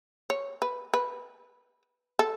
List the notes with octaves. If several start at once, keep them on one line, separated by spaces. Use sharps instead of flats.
C#5
B4
B4
A4